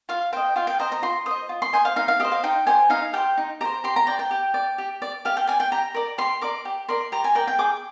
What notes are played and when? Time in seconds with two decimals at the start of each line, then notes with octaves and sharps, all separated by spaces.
0.09 F4 F5
0.32 C5 D#5 G5
0.56 F4 F5
0.67 G5
0.79 C5 D#5 A#5
0.92 A#5
1.02 F4 C6
1.26 C5 D#5 D#6
1.49 F4
1.62 C6
1.73 C5 D#5 G#5
1.85 F5
1.96 D#4 F5
2.08 F5
2.20 G4 C5 D#5
2.32 F5
2.43 D#4 G5
2.67 G4 C5 G#5
2.90 D#4 F5
3.13 G4 C5 G5
3.37 D#4
3.61 G4 C5 A#5
3.84 G4 C6
3.96 A#5
4.07 D5 G5
4.19 G5
4.31 G4
4.54 D5
4.78 G4
5.02 D5
5.25 G4 F5
5.37 G5
5.47 D5 G#5
5.60 G5
5.72 G4 A#5
5.94 A#4 D5
6.18 G4 C6
6.41 A#4 D5 D6
6.65 G4
6.88 A#4 D5 C6
7.12 G4 A#5
7.24 G#5
7.35 A#4 D5 G5
7.48 G5
7.58 G#4 D6